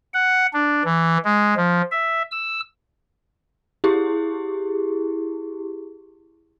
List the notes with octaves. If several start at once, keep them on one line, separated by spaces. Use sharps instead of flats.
F#5
D4
E3
G#3
F3
E5
E6
E4 G4 G#4